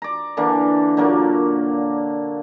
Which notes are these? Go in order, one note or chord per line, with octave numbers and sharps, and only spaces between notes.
D5 A#5
D3 E3 A#3 D4
A#2 D3 F#3 A#3